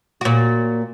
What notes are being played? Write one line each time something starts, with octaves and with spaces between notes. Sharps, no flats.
A#2 F#4